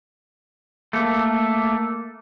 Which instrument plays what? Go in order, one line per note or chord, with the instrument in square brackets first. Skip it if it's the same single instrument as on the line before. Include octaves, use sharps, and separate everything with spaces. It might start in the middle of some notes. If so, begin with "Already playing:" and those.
[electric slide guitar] A3 A#3 A4